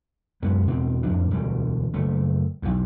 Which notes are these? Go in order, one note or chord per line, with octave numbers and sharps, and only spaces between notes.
F#2 G#3 B3
E2 B2 C4
F2 A2 D4
E1 D2 G3
F#1 A3
B1 E2